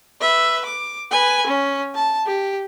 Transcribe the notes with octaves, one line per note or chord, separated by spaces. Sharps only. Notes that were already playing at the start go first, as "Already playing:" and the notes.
B4 E5
D6
B4 G#5
C#4
A5
G4